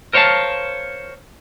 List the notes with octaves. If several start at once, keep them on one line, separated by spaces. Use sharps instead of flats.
A#4 C5 C#5 D#5 F5 A5